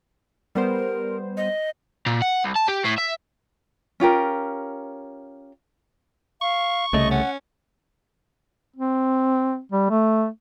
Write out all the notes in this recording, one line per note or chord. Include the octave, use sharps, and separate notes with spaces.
G3 B3 A#4 C5
D#5
A#2
F#5
C2
A5
G4
A2
E5
C#4 F4 G4 A#4
F5 C#6
C2 C#3 A3 D#5
C#4 F#5
C4
G3
A3